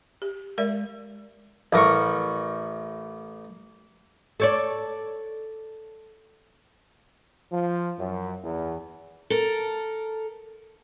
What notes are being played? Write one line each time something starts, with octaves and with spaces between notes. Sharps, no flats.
G4
G#3 A#4 D5 E5
A1 A#4 C#6
A4 C#5 D5
F3
F#2
E2
A4 A#4